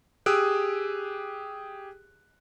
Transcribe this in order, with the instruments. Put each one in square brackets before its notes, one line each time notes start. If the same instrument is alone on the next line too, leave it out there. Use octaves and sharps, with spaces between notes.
[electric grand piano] G4 G#4 D#6 E6 F#6 D7